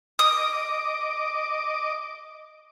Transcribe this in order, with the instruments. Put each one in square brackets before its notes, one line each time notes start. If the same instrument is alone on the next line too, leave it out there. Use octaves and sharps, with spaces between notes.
[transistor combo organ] D#5 D6 [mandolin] D#6